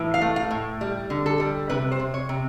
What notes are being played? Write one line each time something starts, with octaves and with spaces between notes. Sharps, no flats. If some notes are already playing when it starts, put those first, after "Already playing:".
Already playing: A2 E3
F5
A3
F5
A2
G3
D3
A4
G3
C3 B4
C5
C3
C#5
C3